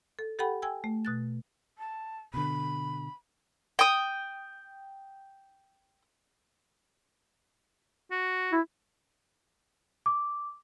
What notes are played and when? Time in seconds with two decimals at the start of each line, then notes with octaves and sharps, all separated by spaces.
0.19 A4
0.39 G4 A4 F#5 G5 B5
0.62 G5 G#5 E6 G#6
0.84 A3
1.05 B2 F#6 A6
1.78 A5
2.34 B2 D3 B5
3.79 G5 D#6
8.11 F#4
8.52 E4
10.06 D6